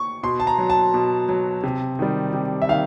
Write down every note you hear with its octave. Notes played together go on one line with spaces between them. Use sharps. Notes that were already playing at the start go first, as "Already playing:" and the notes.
Already playing: C#6
B2 C6
A5
A#5
F#3
A5
B2
F#3
C3
D#3 G3
C3
E5
D#3 F5